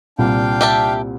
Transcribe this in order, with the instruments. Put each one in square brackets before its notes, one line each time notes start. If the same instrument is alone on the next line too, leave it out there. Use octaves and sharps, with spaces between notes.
[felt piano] C2 A#2 G3 [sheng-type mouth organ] D4 F5 G5
[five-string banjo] G4 E5 A5